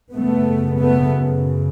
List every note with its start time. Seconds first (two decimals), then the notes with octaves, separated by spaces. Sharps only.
0.13 F#2 C#3 A3 B3
0.78 A3 B3